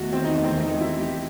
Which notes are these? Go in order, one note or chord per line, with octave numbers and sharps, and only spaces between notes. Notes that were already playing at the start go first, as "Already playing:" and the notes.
Already playing: E2 D#3 A3 F#4
C4
D#4
C4
D#4
E4
G4